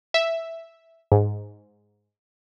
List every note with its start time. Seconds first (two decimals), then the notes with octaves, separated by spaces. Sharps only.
0.14 E5
1.12 G#2